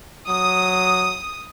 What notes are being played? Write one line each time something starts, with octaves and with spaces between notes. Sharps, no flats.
F#3 D#6